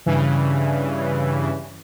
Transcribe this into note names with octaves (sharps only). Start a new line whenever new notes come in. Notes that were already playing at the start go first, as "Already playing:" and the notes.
G2 C#3 E3